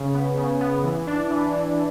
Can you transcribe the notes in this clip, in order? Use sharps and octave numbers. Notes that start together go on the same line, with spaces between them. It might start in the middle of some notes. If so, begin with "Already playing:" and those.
Already playing: C#3
B3
C#3
B3
E3
D4
E3
E3